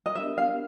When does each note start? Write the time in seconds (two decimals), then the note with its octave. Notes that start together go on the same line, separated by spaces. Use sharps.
0.06 D#5
0.15 B3 D4 G4 A#4 E5
0.38 F5